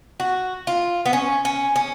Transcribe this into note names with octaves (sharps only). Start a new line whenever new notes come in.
F#4
F4
B3
C#4
C#4
C#4